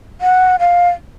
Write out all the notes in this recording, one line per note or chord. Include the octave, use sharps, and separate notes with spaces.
F#5
F5